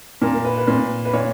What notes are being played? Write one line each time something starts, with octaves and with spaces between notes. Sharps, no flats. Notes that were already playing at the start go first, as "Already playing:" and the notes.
A#2 A#4
A#4
B4
B4
A#2 B4
B4
A#2 C#5